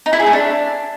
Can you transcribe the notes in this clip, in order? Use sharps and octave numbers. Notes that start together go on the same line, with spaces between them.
D#4
E4
G#4
A3
D4